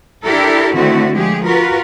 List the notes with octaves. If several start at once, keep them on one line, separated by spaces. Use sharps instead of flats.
D4 E4 G4 A4 A#4
D3 D#3 A3 C4 E4 F#4
F3 G#3 A3 G4 G#4
F4 F#4 A#4 B4